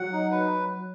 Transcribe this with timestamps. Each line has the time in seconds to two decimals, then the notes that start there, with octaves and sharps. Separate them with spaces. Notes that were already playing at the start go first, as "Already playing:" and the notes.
Already playing: F#3 F#5
0.13 D#4
0.31 B4